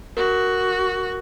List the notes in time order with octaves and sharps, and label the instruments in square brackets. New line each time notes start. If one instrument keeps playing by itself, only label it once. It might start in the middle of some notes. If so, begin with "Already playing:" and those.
[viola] F#4 [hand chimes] A#4